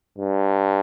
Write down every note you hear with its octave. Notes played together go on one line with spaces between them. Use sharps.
G2